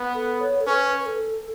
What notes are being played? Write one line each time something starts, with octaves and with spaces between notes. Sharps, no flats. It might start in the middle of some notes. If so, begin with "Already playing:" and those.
Already playing: B3
A4
C#5
A4
C#4 B4
B4
A4